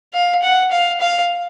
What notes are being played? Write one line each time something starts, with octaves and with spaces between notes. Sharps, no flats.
F5
F#5
F5
F5